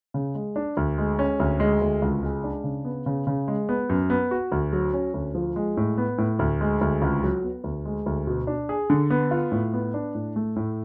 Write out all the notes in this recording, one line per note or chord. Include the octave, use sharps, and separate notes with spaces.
C#3
G#3
D4
D2
G#3
C#4
D2
G#3
D2
C#2
G#3
D4
C#3
B3
C#3
C#3
G#3
B3
F#2
B3
F#4
D2
F#3
C#4
D2
F3
G#3
A2
B3
A2
D2
G#3
D2
C#2
F#3
B3
D2
G#3
D2
B2
D4
G#4
D3
B3
F4
A2
B3
D4
A2
A3
A2